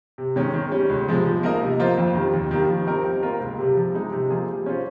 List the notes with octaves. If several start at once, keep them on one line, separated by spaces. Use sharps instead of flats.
C3
D#3 G#3 C#4
D#3
G3 C#4
C#2
C3 F3 G#3
F3
A#3 D#4 A#4 D#5
C3
F3 A#3 F4 C5
F2
D#3 G3
D#2
D#3 G3 A#3
F3
C4 D#4 G4 A#4
G3
A#3 F4 A#4
C#2
C3 G3
F3
G#3 D#4
C3
F3 A#3 F4 G#4
G3
C#4 F4 C5